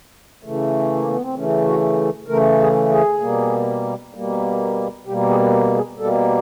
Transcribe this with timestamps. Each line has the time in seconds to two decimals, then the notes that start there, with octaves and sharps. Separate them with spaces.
0.43 C#3 E3 A3
0.96 A#3
1.08 B3
1.22 C4
1.35 C#3 E3 A3 C#4
1.66 F#4
2.28 C#3 E3 A3 A#4
2.59 G#4
2.90 G#4
3.20 B2 G3 A#3
4.14 B2 G3 A#3
5.06 B2 G3 A#3 G4
5.29 G#4
5.75 G#4
5.98 B2 G3 A#3 A4